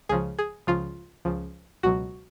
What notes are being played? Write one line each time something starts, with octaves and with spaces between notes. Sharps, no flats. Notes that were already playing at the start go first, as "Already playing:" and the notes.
C#2 C#3 F3 G#4
G#4
C#2 C#3 F3 F4
C#2 C#3 F3
C#2 B2 F#3 F#4